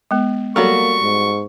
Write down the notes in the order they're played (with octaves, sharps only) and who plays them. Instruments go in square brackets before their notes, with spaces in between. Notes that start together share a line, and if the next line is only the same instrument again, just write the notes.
[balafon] G#3 B3
[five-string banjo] F#3 G3 F#4 [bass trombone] A#3 [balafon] A4 C#5 [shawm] C#6
[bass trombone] G#2